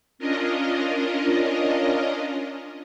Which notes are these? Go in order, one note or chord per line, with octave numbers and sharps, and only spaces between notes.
C#4 D4 F4 A#4 D#5